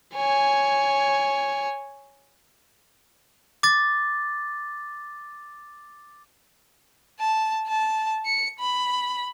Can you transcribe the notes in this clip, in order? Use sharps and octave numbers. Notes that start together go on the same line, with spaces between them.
C#5 G#5
D6 A6
A5
A5
C#7
B5